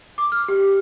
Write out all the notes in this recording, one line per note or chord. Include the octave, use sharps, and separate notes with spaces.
D6
F6
G4